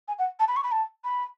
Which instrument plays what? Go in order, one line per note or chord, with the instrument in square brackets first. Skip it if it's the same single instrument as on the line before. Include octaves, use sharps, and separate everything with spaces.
[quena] G#5
F#5
A5
B5
C#6
B5
A5
B5